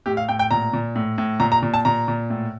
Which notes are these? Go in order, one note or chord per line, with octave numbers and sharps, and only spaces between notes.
A2 G4
F5
A2 G5
G5
A#2 A#5
A#2
A2
A2
A#2 A#5
A#5
A#2
A5
A#2 A#5
A#2
A2